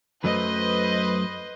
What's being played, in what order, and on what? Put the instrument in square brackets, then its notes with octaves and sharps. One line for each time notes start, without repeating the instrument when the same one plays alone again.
[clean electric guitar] F#2 F#3 A3 [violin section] B4 C5 D#5